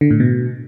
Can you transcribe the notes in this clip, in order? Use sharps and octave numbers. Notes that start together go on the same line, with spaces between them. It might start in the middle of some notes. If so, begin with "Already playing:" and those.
D3
A2
B2